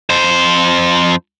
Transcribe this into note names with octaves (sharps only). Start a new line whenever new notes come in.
F2 C5